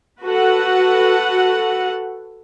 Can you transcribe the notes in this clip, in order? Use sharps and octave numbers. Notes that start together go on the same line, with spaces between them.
F#4 A4 B4 F#5